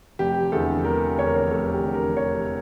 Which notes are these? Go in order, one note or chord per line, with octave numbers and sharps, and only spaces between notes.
F1 G4
E2 D3 A4
F1 A#4
E2 D3 C#5
A#4
C#5
F1 A4
G4
E2 D3
A#4
F1 C#5